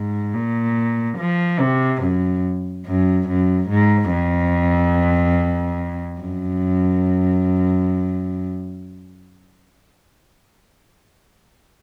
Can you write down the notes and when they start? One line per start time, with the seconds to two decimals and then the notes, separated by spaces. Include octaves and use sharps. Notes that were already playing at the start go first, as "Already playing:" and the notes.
Already playing: G#2
0.34 A#2
1.18 F3
1.59 C3
2.02 F#2
2.86 F#2
3.28 F#2
3.69 G#2
4.12 F2
6.21 F#2